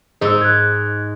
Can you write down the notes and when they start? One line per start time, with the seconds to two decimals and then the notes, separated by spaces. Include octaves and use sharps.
0.21 G#2 D#4 G#4 E6
0.42 F#6 G#6